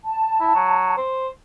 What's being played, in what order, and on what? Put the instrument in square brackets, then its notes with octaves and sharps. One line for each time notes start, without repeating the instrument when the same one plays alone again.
[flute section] A5
[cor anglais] E4
F#3
C5